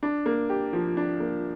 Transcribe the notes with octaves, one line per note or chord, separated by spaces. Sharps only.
D4
A#3
G4
F3
D4
A#3